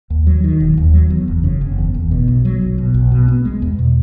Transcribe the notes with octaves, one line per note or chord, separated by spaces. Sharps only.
D#2
F#3
D#3
E1
D#2
F#3
E2
F#1
C#3
F#1
E2
F#1
B2
B1
F#3
B1
B2
B1
B2
B3
G#3
E2
B2